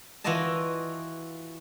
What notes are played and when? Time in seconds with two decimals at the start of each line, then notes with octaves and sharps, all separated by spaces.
0.24 E3 F4 F#4 D5 D#5 A5